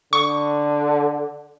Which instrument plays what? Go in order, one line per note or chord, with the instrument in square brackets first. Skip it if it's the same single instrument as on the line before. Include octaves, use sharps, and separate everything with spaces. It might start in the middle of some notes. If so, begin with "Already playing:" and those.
[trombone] D3 [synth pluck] C#6